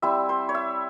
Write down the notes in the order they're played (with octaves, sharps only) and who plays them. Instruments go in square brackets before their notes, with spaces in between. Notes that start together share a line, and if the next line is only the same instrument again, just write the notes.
[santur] G3 C4 E4 E5
C5
C#5
E5